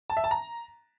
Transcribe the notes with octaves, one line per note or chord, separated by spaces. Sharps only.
A5
E5
A5
A#5